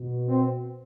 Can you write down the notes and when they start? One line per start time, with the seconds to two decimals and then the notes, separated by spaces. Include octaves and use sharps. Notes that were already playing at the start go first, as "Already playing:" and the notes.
Already playing: B2
0.28 C4